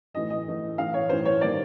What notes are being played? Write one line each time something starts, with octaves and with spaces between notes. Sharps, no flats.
A2 E3 A3 D#5
D#5
A2 E3 A3
A2 E3 A3 F5
C#5
A2 E3 A3 C5
C#5
D#3 G3 A#3 D5